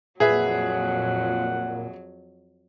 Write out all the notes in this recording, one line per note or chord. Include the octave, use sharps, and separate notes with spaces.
F2 A#2 F#3 G#4 B4 E5 F#5